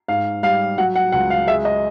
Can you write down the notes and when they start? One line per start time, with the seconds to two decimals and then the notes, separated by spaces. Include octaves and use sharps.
0.08 G#2 F5
0.43 G3 F5
0.78 F#3 F#5
0.96 F#5
1.12 C#2 F#5
1.30 F5
1.47 G#3 E5
1.65 D#5